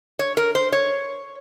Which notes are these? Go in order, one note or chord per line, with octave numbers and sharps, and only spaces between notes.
C#5
A#4
C5
C#5